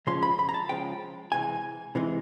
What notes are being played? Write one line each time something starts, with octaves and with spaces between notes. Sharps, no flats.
C#3 F3 G#3 C#4 F4 C6
B5
B5
A#5
A5
C#3 F3 G#3 C#4 F4 G5
C3 E3 G#3 G#5
C3 E3 G#3